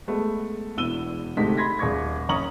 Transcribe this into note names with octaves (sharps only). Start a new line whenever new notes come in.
G#3 A3 B3
E1 E2 E4 E6 D#7 G7
D2 G#2 C3 A3 D#4 B6
B5 C6 G#6 A#6 B6
D#1 G#4 C#6 G#6
F#1 C#4 A#5 C#6 D#6 F#7